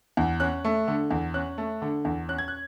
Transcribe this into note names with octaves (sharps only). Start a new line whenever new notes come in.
E2
C#4 F#6
A3
D3
E2
C#4 F#6
A3
D3
E2
C#4 F#6
G#6
F#6